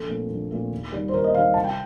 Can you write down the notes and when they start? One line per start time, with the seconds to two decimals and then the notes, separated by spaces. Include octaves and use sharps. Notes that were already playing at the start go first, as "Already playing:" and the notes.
Already playing: A#1 A4
0.09 A#2 A3 C4
0.30 A#1
0.51 A#2 A3 C4
0.71 D#2
0.92 D#3 G3
1.08 C5
1.13 D#2 A#4
1.24 D#5
1.34 D#3 F5
1.38 G3
1.54 C2 A5
1.64 G5